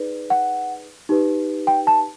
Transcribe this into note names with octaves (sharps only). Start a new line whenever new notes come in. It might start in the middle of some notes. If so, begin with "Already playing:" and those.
Already playing: D#4 G#4 B4 D5
F#5
D#4 G4 B4
G5
A5